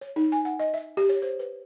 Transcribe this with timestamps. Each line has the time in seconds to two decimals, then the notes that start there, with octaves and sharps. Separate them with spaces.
0.01 C#5
0.16 D#4
0.32 G#5
0.45 F#5
0.59 D#5
0.74 E5
0.97 G4
1.09 C#5
1.22 C5
1.39 B4